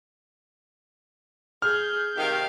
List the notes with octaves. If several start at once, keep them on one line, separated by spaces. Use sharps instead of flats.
G#4 F6 G6
C3 D#3 G4 F5